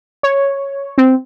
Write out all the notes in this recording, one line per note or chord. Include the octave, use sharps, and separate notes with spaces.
C#5
C4